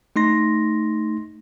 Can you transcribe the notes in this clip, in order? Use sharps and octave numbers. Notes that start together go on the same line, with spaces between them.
A3 D#4 C6 A#6